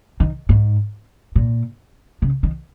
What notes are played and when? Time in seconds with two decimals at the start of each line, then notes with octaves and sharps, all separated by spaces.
0.20 D#3
0.49 G#2
1.36 A#2
2.22 C#3
2.43 D#3